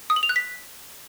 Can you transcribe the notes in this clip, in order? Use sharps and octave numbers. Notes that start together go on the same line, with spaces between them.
D#6
F#7
F7
F#6
B6